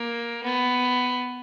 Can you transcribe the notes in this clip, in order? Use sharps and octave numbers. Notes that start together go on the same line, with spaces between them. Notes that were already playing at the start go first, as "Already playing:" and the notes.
Already playing: A#3
B3